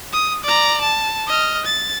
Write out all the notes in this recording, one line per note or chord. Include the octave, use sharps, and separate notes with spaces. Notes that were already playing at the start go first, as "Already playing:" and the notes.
D#6
D5 A#5
A5
D#5 F6
A6